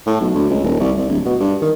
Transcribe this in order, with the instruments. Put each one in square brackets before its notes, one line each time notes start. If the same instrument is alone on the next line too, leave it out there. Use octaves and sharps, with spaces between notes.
[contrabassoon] A2
B1
D2
C#2
D#1
C2
C2
D1
B2
G2
D#3